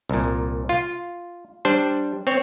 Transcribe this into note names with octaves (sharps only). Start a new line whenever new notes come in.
C2 A#2
F4
G3 D4 C5
C4 C#5